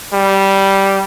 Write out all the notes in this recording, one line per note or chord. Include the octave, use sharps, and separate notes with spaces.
G3